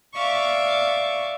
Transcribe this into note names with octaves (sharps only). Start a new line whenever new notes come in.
D5 E5 F5 C#6